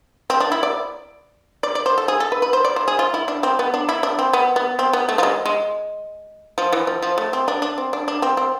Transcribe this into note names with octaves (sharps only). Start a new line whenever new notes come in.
C4
D4
E4
D5
D5
D5
C5
A4
G#4
A4
B4
B4
C5
D5
C5
G#4
F4
E4
D4
C4
B3
D4
E4
D4
C4
B3
B3
C4
B3
A3
F3
G#3
G#3
F3
E3
F3
F3
A3
C4
D4
D4
C4
D4
D4
C4
C4